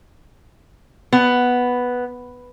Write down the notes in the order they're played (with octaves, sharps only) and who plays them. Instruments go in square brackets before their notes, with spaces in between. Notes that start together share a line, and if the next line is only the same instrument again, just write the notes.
[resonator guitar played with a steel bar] B3